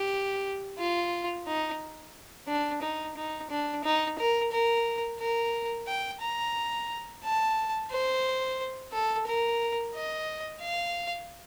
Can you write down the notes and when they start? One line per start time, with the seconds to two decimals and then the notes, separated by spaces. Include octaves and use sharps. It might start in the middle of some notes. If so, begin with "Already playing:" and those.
Already playing: G4
0.78 F4
1.47 D#4
2.48 D4
2.82 D#4
3.17 D#4
3.50 D4
3.84 D#4
4.18 A#4
4.52 A#4
5.20 A#4
5.87 G5
6.21 A#5
7.24 A5
7.91 C5
8.92 A4
9.27 A#4
9.95 D#5
10.62 F5